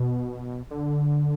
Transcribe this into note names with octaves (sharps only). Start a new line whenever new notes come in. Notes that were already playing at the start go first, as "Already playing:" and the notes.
Already playing: B2
D3